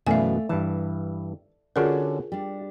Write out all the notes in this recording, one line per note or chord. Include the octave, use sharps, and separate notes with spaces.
F#2 B2 E3 A3 D5 E5 F5 G#5
G2 E3 A5
D3 C#4 D4 F4 F#4 G#4 A#4 F#5
G3 D4 G4